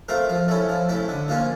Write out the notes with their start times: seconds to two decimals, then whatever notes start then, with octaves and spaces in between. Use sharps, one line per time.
0.09 A3 C4 F4 A#4
0.29 F3
0.48 A3 C#4 E4
0.69 F3
0.89 A3 C#4 E4
1.08 D3
1.28 F3 A#3 C#4 F4